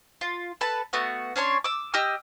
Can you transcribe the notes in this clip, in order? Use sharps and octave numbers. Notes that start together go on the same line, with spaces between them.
F4
A4 B4 A5
A3 B3 F#4 F#5
C#4 D4 C#5 C6
D6 E6
G4 D#5 E6 F6